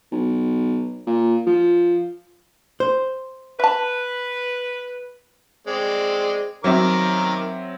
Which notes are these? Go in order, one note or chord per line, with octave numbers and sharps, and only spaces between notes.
B1
A#2
F3
C5
B4 E5 A5
G#3 C4 D5
D#3 F#3 C4 A#4 E5 D6